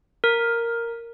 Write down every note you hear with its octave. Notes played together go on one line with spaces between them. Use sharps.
A#4